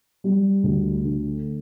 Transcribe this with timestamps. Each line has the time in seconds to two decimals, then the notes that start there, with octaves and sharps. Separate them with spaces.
0.24 G3
0.63 D2
1.03 D3